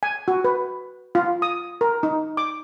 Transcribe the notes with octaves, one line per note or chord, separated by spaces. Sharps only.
G#5
F#4
B4
F4
D#6
A#4
D#4
D6